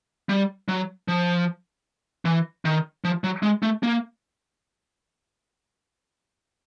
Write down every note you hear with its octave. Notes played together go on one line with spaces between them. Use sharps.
G3
F#3
F3
E3
D#3
F3
F#3
G#3
A3
A#3